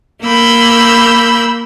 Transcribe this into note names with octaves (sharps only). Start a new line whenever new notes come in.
A#3 B5 E6 G6